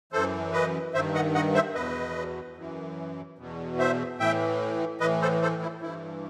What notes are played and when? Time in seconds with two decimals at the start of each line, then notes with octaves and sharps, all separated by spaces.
0.12 F#2 E3 A4 C5
0.53 B4 D#5
0.94 G2 D#3 C5 E5
1.14 D#5 F#5
1.35 D#5 F#5
1.54 C5 E5
1.75 E2 B2 B4 D#5
2.57 F#2 E3
3.38 E2 B2
3.79 C5 E5
4.19 A2 E3 E5 G5
5.00 A2 E3 B4 D#5
5.22 A4 C5
5.42 A4 C5
5.62 E4
5.82 G2 E3 E4